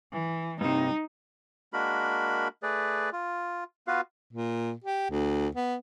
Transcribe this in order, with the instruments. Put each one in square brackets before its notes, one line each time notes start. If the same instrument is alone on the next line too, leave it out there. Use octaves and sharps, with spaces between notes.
[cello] E3
[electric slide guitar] G2 C3 [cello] D#4
[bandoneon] G#3 A#3 D4 F#4 A#4 B5
A3 G#4 B4 D5
F4
B3 F4 F#4 B4 F5
[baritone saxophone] A#2
G4
D2
B3